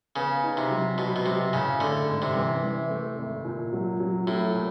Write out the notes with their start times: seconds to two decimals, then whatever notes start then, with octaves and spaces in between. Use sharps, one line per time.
0.16 C#3 B3
0.43 D#4
0.57 C3
0.71 F#3
0.98 B2 F#3
1.16 B2
1.25 C3 F#3
1.53 A2 C#3
1.80 D3 A3
2.07 G#2
2.22 C3
2.35 E3
2.63 E3
2.90 A3
3.18 G#1
3.44 A#2
3.73 F#3
4.00 F#3
4.27 A2 F#3
4.55 A#2